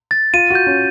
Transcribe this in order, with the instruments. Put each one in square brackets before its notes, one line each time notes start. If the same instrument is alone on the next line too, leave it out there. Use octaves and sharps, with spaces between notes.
[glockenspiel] A6
[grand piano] F4 [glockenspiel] D#7
[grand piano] F#4 [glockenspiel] G6
[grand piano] C#4